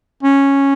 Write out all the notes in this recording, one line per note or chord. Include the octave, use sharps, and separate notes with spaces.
C#4